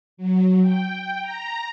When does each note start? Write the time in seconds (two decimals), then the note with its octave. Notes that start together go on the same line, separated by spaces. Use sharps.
0.17 F#3
0.61 G5
1.22 A#5